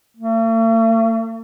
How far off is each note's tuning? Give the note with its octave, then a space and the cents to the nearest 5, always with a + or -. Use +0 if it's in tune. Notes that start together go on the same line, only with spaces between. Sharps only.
A3 +45